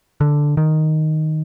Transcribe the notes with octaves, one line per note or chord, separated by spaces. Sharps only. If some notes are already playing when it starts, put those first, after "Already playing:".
D3
D#3